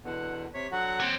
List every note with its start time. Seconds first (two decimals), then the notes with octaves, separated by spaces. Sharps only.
0.04 E2 B2 D3 F#5
0.54 C3 C#5 B6
0.71 D3 F#3 F#4 F#5
1.00 C4 C#5